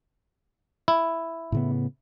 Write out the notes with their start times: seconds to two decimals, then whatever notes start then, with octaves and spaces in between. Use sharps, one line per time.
0.88 E4
1.52 A2 C#3 B3